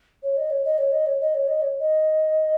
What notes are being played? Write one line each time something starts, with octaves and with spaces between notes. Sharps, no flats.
C#5
D#5
C#5
D#5
C#5
D#5
C#5
D#5
C#5
D#5
C#5
D#5